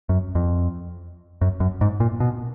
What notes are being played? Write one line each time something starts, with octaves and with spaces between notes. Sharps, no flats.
F#2
F2
F#2
F#2
G#2
A#2
B2